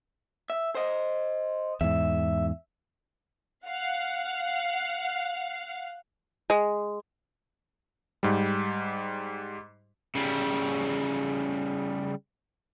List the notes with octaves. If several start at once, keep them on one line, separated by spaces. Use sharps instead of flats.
E5
C5 D#5
E2 G#2 E5
F5 F#5
G#3
G#2 G3
C#3 G3